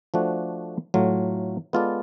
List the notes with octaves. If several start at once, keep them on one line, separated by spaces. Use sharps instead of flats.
F3 A3 D4 F#4
A2 F#3 A3 F4
G#3 B3 F4 A4 D5